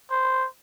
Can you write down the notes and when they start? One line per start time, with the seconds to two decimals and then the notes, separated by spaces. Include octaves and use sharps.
0.11 C5